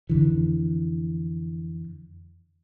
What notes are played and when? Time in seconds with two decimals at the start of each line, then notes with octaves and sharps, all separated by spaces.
0.09 F2 D3 E3